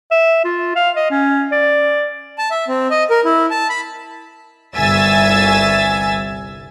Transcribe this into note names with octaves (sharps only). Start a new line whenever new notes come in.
E5
F4
F5
D#5
C#4
D5
A5
E5
C4
D#5
A#4
E4
A5
B5
G1 C2 E5 G#5 E6 A6